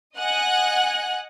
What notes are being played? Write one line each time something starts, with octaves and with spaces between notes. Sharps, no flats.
D#5 F#5 G#5 F#6